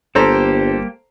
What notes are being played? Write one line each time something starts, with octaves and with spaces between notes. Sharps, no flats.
G1 G3 A#3 G4 A4 C5 A#5